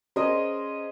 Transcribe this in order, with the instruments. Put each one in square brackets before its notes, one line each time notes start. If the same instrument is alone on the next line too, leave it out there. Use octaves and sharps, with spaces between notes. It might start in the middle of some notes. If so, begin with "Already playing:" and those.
[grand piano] C#4 G#4 A#4 [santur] C5 D#5